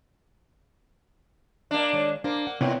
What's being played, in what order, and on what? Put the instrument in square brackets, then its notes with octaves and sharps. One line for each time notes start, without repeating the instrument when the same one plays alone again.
[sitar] A#3 D4
[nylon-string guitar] D#3 G#3 C#5
[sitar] A#3 [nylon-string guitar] D4 C5
[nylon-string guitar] F#5
[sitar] A2 [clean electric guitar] C3 E4 G5 [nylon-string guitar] B3 C#5